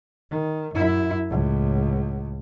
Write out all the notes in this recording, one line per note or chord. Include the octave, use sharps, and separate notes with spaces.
D#3
F#2 E4
C#2 A2